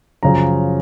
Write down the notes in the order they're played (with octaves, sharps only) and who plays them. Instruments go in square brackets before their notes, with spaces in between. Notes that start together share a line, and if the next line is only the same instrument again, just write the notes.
[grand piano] F#2 C#3 F3 A#5